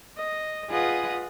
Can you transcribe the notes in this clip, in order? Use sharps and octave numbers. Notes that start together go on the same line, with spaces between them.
D#5
F4 G#4 B4 D#5 F#5 D#6